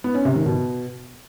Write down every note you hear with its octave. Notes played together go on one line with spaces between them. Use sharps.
B3
C#4
C3
D#3
B2